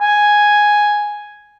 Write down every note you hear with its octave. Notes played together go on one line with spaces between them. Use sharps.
G#5